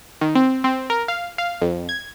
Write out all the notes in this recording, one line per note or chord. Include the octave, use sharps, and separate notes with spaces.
D#3
C4
C4
A#4
F5
F5
F2
G#6